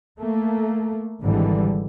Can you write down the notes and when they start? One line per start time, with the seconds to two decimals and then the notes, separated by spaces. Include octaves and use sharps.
0.17 A3 A#3
1.22 G#1 G#2 D3 E3 G3